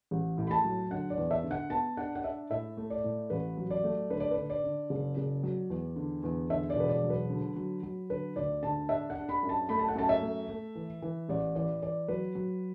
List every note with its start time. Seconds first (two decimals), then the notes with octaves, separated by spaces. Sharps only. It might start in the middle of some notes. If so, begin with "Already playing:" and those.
0.11 A1
0.38 A2
0.47 B5
0.51 A5
0.65 F#3
0.91 D3 F#5
1.10 D5
1.17 E2
1.31 E5
1.44 D3
1.51 F#5
1.70 B3 A5
1.97 D4 F#5
2.15 F#5
2.24 D4 E5
2.50 A2 E5
2.77 A3
2.90 D5
3.04 A2
3.30 A1 B4
3.57 F#3
3.71 D5
3.84 A3
4.10 D3 B4
4.20 D5
4.31 B4
4.37 D3
4.50 D5
4.64 D3
4.90 F#1
5.17 F#1
5.43 F#3
5.70 E2
5.96 D3
6.23 E2
6.50 D3 E5
6.70 D5
6.76 E1 B4
6.89 D5
7.04 F#3
7.10 B4
7.30 D3
7.56 F#3
7.83 F#3
8.10 D3 B4
8.36 D2 D5
8.63 D3 A5
8.89 D4 E5
9.10 F#5
9.16 D4
9.29 B5
9.43 F#2
9.49 A5
9.69 A3 B5
9.79 A5
9.88 F#5
9.95 F#2 A5
10.09 E5
10.22 A3
10.49 A3
10.75 E3
11.02 E3
11.29 A1 D5
11.55 E3 D5
11.82 E3 D5
12.08 F#3 B4
12.35 F#3